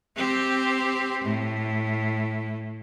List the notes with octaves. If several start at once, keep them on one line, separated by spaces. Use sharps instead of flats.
C4 G4
A2